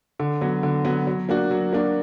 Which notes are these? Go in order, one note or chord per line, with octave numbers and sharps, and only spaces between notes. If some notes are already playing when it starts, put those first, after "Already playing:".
D3
F#3 B3
D3
F#3 B3
F#3
A#3 D4 F#4
F#3
A#3 D4 F#4